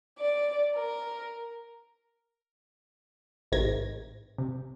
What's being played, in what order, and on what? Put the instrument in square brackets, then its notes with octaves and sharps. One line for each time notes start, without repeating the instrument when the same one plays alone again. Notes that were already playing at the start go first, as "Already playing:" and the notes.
[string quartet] D5
A#4
[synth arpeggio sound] A1 G#2 C3 D#3 G#6 A#6
C3